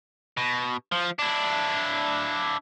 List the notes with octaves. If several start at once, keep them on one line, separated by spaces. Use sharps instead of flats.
B2
F3
D4 E4